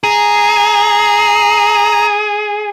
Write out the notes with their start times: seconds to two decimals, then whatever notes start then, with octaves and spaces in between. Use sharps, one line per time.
0.04 G#4 A#5